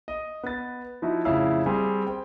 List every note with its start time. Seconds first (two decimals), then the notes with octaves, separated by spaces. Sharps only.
0.08 D#5
0.43 B3 A6
1.02 F3 D#4 E4 F#4
1.25 F2 A2 C#3 E4 F5 E6
1.66 G3 C4 G#4
2.07 C5 G5